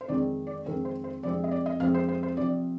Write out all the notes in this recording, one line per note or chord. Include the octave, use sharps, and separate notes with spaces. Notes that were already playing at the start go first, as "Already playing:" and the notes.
C5
F2 D#3 G#3 C4 D5
D5
F2 D#3 G#3 C4 A#4
C5
C5
F2 C3 F3 G#3 C4 D5
D#5
D5
D#5
F2 C3 F3 G#3 C4 F5
C5
C5
C5
C3 F3 C4 D5